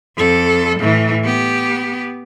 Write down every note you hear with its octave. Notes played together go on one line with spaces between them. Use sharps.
F2 A4
A2 E3
B3 G4